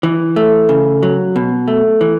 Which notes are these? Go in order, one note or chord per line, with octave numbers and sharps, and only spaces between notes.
E3
A3
C#3
F#3
B2
A3
E3